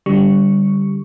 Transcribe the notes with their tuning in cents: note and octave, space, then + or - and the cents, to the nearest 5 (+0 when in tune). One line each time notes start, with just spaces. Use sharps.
D3 -25 G3 +0 C#6 +5